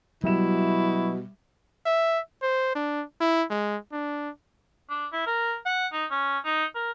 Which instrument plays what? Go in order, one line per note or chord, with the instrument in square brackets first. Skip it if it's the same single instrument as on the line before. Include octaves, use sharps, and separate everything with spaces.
[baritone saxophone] B2 [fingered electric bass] F#3 [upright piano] G3 E5 E7 [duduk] E4
[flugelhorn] E5
C5
D4
E4
G#3
D4
[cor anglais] D4
E4
A#4
F#5
D#4
C#4
D#4
A#4